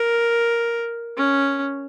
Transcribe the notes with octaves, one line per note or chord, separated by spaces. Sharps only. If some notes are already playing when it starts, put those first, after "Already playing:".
Already playing: A#4
C#4